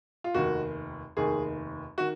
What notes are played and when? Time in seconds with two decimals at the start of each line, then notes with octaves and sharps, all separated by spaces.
0.24 F4
0.34 F1 D#2 D#3 F#4
1.17 F1 D#2 D#3 G#4
1.98 D#3 F#4